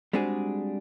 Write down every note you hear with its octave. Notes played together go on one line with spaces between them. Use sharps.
G3 G#3 C4 D4 F#4 G#4